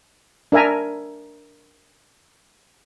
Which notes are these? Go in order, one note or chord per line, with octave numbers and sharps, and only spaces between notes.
D4 A#4 E5 G#5 A#5